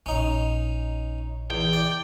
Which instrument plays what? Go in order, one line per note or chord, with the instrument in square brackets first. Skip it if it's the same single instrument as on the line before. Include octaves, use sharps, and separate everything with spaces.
[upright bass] A#1 [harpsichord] C#4 D#4
[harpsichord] E2 [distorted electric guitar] G5
[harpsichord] D5